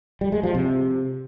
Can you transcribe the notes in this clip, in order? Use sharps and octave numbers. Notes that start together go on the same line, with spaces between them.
G3
G#3
F3
C3